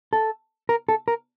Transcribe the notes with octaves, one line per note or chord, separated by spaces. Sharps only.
A4
A#4
A4
A#4